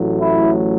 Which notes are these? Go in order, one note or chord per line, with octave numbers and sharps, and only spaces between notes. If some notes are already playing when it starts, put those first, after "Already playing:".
Already playing: A1 A2 F#3
E4